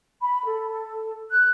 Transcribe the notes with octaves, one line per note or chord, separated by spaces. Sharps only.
B5
A4
F#6